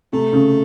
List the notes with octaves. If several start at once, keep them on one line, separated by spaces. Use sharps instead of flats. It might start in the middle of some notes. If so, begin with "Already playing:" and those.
C3 A3
C#3